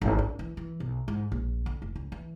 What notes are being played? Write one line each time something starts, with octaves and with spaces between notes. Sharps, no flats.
G#1
D4
E3
E3
B1
G#2
A#1
D3
F1
C#2
E3